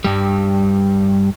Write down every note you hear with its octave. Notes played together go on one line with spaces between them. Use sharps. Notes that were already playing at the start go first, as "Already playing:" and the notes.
G2 G3